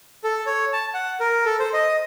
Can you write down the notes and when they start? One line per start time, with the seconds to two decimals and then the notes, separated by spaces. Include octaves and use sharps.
0.24 A4
0.46 C#5
0.73 A5
0.94 F#5
1.20 A#4
1.45 A4
1.60 C5
1.73 D#5